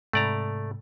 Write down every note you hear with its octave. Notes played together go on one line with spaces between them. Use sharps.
G#2 C3 A3 D5 A#5